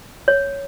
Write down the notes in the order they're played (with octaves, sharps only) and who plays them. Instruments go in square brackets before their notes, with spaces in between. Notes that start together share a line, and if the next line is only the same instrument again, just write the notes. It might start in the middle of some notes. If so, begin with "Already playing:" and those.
[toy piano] C#5